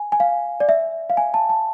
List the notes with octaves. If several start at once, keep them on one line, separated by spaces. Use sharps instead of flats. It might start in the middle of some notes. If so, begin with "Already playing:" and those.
Already playing: G#5
G#5
F5
D5
E5
F5
G#5
A5
A5